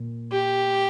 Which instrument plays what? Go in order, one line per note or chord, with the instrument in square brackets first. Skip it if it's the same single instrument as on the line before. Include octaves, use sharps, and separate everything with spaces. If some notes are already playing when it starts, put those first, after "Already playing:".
Already playing: [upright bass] A#2
[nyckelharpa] G4